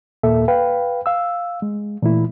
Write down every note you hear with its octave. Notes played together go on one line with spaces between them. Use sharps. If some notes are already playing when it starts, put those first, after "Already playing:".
D#2 A#2 A#3 A4 E5
B4 F5 G5
F5 E6
G#3
A#2 E3 A3 E4